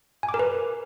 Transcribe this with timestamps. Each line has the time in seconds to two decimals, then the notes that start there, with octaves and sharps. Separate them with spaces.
0.23 G#5
0.29 D6
0.34 A#4
0.39 B4